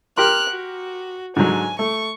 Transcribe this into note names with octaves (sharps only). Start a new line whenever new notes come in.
G4 A#4 C6 F6 F#6
F#4
G#2 D3 F#3 G#5
A3 C#6